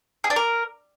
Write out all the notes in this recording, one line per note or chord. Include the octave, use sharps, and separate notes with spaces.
G#4
D4
A#4